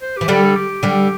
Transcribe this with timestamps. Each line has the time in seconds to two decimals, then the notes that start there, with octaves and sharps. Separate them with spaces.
0.01 C5
0.17 E3 G4
0.28 D3 G3 A4
0.45 A4
0.55 G4
0.83 D3 G3